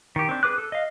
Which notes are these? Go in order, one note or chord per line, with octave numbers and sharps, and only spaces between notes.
D#3 G4
C4 D4
G#4 B4 D6 F#6
A4
D#5 F5